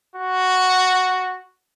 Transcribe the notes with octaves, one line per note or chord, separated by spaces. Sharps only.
F#4